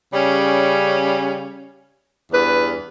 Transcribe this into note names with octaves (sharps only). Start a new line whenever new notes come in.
C#3 G3 C#4
E2 G2 B4